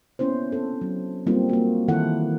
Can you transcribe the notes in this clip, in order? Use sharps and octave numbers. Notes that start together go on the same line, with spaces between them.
A#3 B3 C#4 E4 C5
C4 A4
F#3
G3 A#3 C4 D#4 F4
A#3 F#4
D#3 E3 D#4 E4 A4 F#5